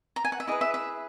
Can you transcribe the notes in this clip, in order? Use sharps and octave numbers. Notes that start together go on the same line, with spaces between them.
A#5
G#5
F#5
E5
E4 G#4 B4 D#5
E5
E5